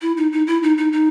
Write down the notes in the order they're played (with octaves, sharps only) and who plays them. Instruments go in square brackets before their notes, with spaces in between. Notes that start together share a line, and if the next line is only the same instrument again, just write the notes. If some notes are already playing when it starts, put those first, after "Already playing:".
[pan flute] E4
D#4
D#4
E4
D#4
D#4
D#4